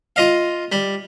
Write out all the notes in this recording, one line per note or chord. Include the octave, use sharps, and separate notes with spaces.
F4 D#5 F5
G3